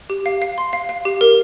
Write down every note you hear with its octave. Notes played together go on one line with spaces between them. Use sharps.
G4
F5
F5
C6
F5
F5
G4
A#4